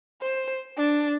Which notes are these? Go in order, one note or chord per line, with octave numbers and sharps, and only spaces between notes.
C5
D4